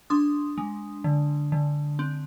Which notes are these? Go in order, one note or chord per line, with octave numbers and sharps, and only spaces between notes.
D4 C6 D#6
G#3
D3
D3
C4